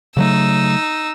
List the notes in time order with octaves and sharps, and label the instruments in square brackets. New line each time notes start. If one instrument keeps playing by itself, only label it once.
[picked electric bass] C#3 F#3 A3 [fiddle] D#4 E6